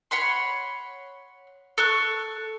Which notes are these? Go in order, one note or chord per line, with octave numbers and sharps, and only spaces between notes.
C#5 F#5 B5 C6
A4 C#6 F#6